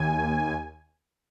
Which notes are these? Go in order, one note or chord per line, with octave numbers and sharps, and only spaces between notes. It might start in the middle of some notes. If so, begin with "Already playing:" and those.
Already playing: D#2 G#5